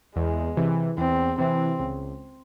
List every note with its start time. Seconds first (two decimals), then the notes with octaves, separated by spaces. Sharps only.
0.15 E2 G#3
0.57 C3 E3
0.98 E2 C4
1.38 C3 E3 C4
1.79 C#2